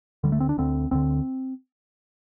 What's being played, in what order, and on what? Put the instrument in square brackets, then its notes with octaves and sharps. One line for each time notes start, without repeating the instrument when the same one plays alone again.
[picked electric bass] D2 D3 G3
A3
C4
D4
D2 D3 C4
D2 D3 C4